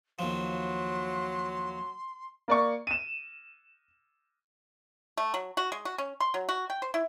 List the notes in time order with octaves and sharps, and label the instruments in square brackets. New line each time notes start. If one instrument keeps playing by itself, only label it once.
[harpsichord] D#2 F3 [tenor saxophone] F#3 [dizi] C6
[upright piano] A#3 D5 C#6
D#7 E7
[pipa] A3
F#3
F#4
G#3
F#4
C#4
C6
F#3
F#4
G5
C5
E4